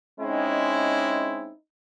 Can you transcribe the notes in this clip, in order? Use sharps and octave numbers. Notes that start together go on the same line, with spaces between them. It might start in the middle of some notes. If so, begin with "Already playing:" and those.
G#3 C4 C#4 D#4 E4